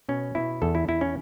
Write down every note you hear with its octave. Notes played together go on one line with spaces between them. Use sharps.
B2 C#4
B2 E4
E2 A4
E4
E2 E4
C#4